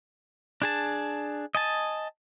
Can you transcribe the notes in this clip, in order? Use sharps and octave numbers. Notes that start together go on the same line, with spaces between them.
D4 G#4 A5
D#5 G#5 A5